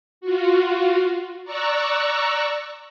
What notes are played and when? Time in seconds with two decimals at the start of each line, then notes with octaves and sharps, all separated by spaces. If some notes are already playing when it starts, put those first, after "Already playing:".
0.21 F4 F#4
1.44 D5 A#5 C#6 E6 F#6